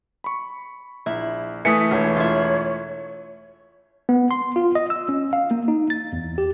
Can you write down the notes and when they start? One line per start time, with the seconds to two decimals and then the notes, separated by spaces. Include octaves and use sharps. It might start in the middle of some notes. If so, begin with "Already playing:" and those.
0.24 B5 C#6
1.06 A#1 E4
1.65 E3 A3 G#5 D#6 B6 C#7
1.91 E1 C#5
2.17 E4 F4
4.09 B3
4.31 C6
4.56 F4
4.75 D#5
4.90 E6
5.09 C#4
5.33 F5
5.51 A#3
5.68 D#4
5.90 A6
6.13 E2
6.38 G4